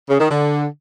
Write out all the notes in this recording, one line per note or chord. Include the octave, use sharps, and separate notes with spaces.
C#3
D#3
D3